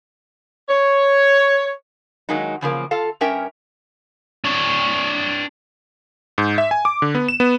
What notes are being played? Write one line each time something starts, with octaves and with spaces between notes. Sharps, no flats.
C#5
D#3 F#3 G#3 A#3 D#4
E2 C#3 F3 A#3
F4 A4 F5
G2 C#4 A#4 E5 G5
D4 C#5
G#2
E5
G#5
D6
D3
B3
E7
B3